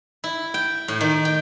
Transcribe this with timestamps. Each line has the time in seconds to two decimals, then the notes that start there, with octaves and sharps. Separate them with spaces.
0.24 E4
0.54 G5
0.88 A2
1.01 D#3
1.25 G5